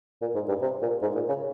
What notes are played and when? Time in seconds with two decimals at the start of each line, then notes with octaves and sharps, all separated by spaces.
0.22 A#2
0.35 G#2
0.49 G2
0.62 C3
0.82 A#2
1.02 G#2
1.15 A#2
1.29 C#3